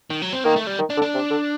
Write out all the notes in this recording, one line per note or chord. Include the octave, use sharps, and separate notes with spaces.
D#3
F#3
C4
D#3 A#3
A3
G3
D#3
D4
D3
D4
C3
D3